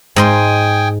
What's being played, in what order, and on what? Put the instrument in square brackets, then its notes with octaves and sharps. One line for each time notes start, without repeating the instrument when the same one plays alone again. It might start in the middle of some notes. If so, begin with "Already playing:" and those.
[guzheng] G#2 D#5 C6 [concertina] G5 G#5 D#6